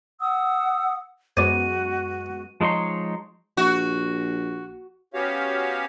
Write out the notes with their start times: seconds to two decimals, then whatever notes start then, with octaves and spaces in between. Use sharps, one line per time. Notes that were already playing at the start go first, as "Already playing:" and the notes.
0.20 F#5 D#6 E6
1.37 F#2 G#3 B3 F#4 C5 D5 D#7
2.60 F3 G#3 D#4 C#5 C6
3.57 A#1 F#4
5.14 B3 C#4 F#4 G4 C#5 F5